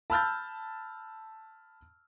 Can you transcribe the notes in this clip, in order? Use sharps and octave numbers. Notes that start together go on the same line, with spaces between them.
A5 B5 E6 F6 G6 A6